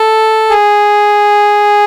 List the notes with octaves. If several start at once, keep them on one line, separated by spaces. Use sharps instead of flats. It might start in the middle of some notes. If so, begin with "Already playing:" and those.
Already playing: A4
G#4